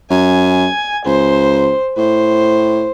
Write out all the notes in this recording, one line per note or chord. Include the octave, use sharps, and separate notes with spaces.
F#2 G#5
C#2 C5
A2 C5